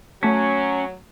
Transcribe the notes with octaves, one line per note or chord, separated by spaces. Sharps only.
F#3 A3 C#4 A5 B6